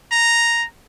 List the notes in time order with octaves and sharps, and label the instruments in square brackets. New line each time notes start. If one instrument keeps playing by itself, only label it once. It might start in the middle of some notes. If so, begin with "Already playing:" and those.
[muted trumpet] A#5